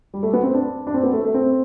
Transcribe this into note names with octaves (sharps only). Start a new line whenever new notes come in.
G3
A3
B3
C4
D4
D4
C4
B3
A3
A3
C4